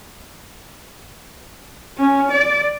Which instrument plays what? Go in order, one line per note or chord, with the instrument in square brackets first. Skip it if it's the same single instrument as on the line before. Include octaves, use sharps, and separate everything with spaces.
[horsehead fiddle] C#4
D5